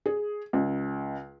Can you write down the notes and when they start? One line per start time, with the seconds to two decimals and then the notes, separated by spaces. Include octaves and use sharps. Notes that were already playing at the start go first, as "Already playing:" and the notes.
0.06 G#4
0.53 C#2